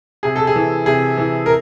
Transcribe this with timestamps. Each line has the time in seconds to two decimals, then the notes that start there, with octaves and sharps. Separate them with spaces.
0.23 C3 G#4
0.36 A4
0.47 G#4
0.56 E3
0.86 C3 G#4
1.18 E3
1.46 A#4